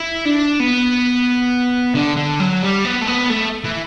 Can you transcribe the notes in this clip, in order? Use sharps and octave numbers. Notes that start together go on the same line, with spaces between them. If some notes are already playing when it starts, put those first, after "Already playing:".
Already playing: E4
D4
B3
D3
D3
F#3
G3
B3
A3
B3
A3
E3